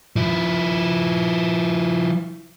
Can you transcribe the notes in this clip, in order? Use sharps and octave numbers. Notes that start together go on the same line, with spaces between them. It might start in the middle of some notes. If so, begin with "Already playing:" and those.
F3 E4